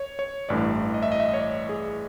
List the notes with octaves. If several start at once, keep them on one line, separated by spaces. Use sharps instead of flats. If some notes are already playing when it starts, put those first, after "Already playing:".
Already playing: C#5
C#5
A1 G2 E3 A3 D5
D#5
E5
D#5
E5
D#5
C#5
D5
G#4